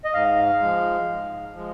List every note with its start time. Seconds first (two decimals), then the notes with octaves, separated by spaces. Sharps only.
0.05 D#5
0.14 G#2 F5
0.60 F3 G#3
1.06 G#2
1.53 F3 G#3